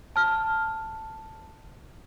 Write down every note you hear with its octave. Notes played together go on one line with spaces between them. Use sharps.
A5 F6